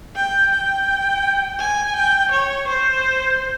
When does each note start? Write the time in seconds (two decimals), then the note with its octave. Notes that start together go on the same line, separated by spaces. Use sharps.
0.16 G5
0.52 G5
1.59 G#5
1.96 G5
2.31 C#5
2.68 C5